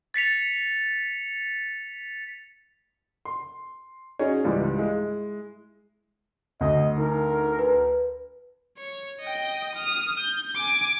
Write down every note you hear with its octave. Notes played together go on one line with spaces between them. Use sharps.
A6 B6 C#7 F7
C6
C#4 D#4 F#4 G#4 C#5
C#2 G#2 E3 G3
G#3 E4
D2 D#5
D#4 A#4
B4
C#5
D#5 G5
D#6 F6
G6
G#5 D6